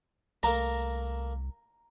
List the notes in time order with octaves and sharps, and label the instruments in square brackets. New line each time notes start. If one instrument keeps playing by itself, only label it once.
[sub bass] C2 [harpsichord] A3 A#3 A#4 [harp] A#5